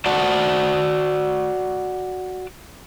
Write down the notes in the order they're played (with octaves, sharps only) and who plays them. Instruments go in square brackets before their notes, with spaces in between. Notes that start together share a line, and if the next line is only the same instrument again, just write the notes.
[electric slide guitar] F#4 D5 F#5 A5